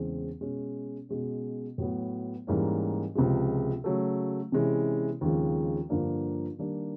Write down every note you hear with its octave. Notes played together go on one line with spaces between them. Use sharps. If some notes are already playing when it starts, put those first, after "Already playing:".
Already playing: E2 C#3 E3 G#3 C4
B2 G#3 C#4
B2 G#3 C#4
A2 F#3 B3
G#2 E3 G3 A#3 C#4
C#2 C3 F3 G#3
C#3 F#3 A3
C3 E3 G#3 C#4 E4
D#2 C#3 F3 G#3 C4
G2 D3 F3 A#3 D4
D#3 G3 A#3 D4